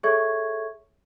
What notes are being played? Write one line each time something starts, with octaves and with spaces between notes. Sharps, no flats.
G#4 A4 C#5 E5 C#6 G#6